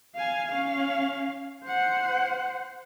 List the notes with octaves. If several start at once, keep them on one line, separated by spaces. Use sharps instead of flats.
F5 G#5
C#4 F5
C5 F#5